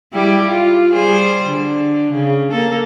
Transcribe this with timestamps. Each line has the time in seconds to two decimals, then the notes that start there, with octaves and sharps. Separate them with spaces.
0.13 G3 E4 G4
0.48 F4
0.92 G3 G#4 C5
1.48 D3
2.13 C#3
2.51 A#3 A4